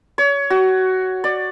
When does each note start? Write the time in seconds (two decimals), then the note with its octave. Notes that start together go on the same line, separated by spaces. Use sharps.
0.18 C#5
0.50 F#4
1.24 D5